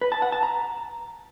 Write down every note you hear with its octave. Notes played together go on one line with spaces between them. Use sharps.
B4
A5
F#5
A5
A#5